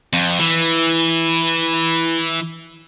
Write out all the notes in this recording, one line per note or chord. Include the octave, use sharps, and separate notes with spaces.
F2
E3